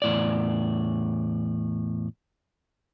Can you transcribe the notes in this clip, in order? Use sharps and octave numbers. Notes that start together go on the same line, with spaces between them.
E2 A2 D5